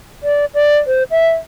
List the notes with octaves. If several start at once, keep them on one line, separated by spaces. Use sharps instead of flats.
D5
D5
C5
E5